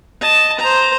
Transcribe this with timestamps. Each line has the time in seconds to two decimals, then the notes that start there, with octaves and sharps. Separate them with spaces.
0.21 D#5 A5
0.59 C5 A#5